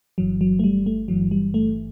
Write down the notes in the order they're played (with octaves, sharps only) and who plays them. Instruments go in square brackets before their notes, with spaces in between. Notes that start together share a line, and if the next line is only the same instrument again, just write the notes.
[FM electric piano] G1 G2 E3 F#3
F#3
A3
G3
A3
G1 G2 E3 F#3
G3
A3